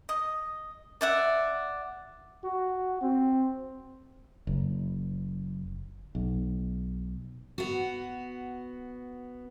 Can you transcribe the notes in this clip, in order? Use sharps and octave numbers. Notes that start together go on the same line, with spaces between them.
D#5
D5 E5 F#5
F#4
C4
F#1
B1
B3 F#4